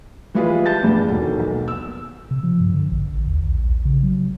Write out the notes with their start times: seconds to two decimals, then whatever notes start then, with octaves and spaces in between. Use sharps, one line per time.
0.34 E3 G3 G#3 F4 G#4 B4
0.66 A5 G6 A6
0.82 E2 G2 G#3
1.08 D#1 B2 D#3
1.40 B1
1.68 E6
2.31 C3
2.43 F3
2.60 G2
2.74 D3
2.92 A1
3.27 D#2
3.43 A#1
3.85 C#3
4.03 F#3